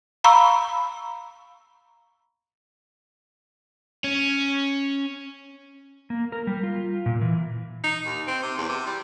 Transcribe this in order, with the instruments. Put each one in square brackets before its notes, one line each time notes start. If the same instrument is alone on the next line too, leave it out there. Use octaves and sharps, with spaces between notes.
[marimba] F5 A#5 B5 C#6 E6
[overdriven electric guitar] C#4
[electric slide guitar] A#3
A#4
G3
F4
A#2
E3
[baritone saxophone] D#4
D#2
C4
C3
E2
C3
G3